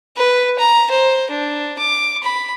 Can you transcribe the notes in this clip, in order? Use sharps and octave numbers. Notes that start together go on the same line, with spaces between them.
B4
A#5
C5
D4
D6
B5